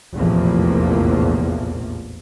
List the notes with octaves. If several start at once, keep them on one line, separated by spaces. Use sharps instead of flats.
F1 A#1 E2 A2 F3 A#3